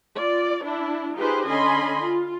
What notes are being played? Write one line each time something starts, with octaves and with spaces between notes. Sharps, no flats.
F4 D5
D4 E4
D#4 F4 G4 G#4 B4 C5
D3 C#4 D#5 G#5 B5 C6
F4